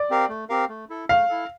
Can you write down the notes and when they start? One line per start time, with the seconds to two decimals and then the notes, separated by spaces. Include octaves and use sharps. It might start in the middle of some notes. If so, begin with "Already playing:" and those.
Already playing: D5
0.10 C4 G4 A#4 F5
0.29 A3
0.49 C4 G4 A#4 F5
0.69 A3
0.89 E4 A4
1.09 A3 F5
1.29 E4 A4